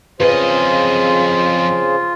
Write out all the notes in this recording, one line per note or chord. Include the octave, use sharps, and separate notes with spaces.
F2 C#3 F4 G#4 B4 C5 D#5